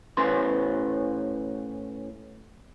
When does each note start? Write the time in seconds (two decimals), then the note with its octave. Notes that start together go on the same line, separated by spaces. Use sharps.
0.17 A2 C#4 B4 C5 C6